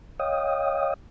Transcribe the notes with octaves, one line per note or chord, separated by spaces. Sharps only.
C#5 D#5 F5 G5 D#6